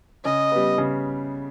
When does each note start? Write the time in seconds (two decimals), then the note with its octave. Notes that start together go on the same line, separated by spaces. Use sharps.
0.25 C#3 D#5
0.52 G3 B3
0.78 C#3